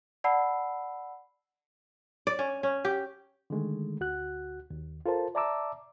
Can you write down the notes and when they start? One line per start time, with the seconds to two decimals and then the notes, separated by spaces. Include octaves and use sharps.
0.24 D5 F#5 A5 B5 E6 C7
2.27 D5
2.39 C#4
2.63 C#4
2.85 G4
3.50 D3 D#3 G#3 A3
4.00 D2 F#4 F#6
4.70 D#2
5.06 F4 A4 A#4 C5 A5
5.35 D5 E5 A5 A#5 D6 E6